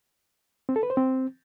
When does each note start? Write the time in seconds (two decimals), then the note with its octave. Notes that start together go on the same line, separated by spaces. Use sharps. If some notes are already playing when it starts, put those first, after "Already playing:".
0.69 C4
0.76 A4
0.83 B4
0.90 C5
0.97 C4